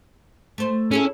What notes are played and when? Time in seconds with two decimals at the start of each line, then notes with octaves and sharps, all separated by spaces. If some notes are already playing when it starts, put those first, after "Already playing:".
0.58 A3 C5
0.91 C#4 E4 G#4 A4